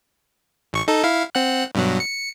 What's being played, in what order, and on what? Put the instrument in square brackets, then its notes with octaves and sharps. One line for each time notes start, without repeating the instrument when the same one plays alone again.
[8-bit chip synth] A1 C#6
D#4 A4
E4 F5
C4 F#5 F#6
G2 B2 F#3
C#7